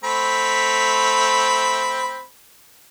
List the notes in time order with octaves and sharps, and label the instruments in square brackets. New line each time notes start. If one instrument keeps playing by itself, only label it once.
[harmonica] A3 C4 B5